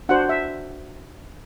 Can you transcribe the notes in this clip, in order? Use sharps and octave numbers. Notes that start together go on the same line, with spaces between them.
D4 F#4 C5 F#5
E5